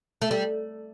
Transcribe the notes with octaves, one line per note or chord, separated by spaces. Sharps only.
A3
G3